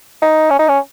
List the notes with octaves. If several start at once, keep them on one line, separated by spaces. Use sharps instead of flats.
D#4
C#4
D#4
C#4